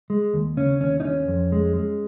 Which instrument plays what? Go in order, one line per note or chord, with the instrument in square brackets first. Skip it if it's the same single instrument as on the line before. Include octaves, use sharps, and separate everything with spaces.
[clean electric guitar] G#3
D#2
C#3 C#4
D#2 C#4
D#4
D#2 C#4
F2
G#3
G#3